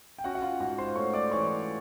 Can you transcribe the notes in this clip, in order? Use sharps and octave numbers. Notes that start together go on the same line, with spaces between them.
G5
C#4 F#4 F#5
F#5
F4 F5
G#2 F#4 F#5
C5 C6
A3 C#5 C#6
D5 D6
E3 C#5 C#6